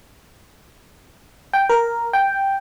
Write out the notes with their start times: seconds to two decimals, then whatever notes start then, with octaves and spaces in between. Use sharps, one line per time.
1.53 G5
1.69 A#4
2.13 G5